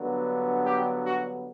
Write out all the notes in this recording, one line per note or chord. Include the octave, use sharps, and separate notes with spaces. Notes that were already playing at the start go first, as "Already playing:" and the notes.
Already playing: G2 D3 F#3 B3
G4
F#4